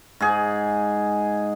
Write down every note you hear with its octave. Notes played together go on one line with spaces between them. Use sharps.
G#2 G#4